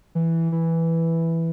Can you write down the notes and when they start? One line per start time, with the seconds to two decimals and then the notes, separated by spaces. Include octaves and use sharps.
0.15 E3
0.52 E3